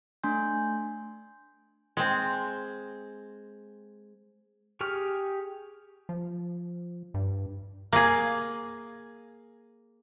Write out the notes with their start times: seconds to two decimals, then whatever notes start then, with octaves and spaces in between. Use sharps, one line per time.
0.23 A3 D4 G#5 C6 G6
1.97 G#3 C4
4.81 G4 G#4 C#6 F6
6.09 F3
7.14 G2
7.93 A#3 G#4